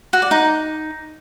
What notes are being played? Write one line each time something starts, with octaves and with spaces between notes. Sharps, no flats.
F#4
D5
D#4